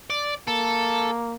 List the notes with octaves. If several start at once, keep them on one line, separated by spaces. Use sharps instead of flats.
D5
A#3 A4